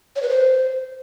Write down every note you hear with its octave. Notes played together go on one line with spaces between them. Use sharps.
C#5
B4
C5